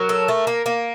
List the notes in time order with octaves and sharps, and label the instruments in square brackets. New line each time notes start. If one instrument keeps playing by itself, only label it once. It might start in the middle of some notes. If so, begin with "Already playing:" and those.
Already playing: [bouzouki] F#3 [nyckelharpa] A#4
[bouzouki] A4
A3
A#3
A#3